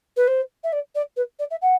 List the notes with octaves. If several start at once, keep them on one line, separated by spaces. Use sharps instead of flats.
B4
C5
E5
D5
D5
B4
D5
E5
F#5